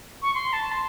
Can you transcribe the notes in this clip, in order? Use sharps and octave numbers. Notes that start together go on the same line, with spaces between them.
C#6
C6
A5
C6